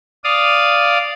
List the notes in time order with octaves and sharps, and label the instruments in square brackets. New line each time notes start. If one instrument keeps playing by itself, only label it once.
[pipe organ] D5 F5 D#6